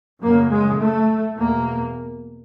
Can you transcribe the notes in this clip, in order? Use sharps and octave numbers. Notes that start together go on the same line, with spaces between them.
F#2 C#3 A#3
G#3
A3
E2 B2 A#3